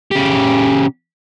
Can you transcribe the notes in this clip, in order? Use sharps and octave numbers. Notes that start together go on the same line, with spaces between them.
C#3 G4